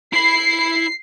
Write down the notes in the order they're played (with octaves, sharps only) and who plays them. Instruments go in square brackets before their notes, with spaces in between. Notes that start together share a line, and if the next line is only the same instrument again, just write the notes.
[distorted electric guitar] E4 B5 [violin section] C7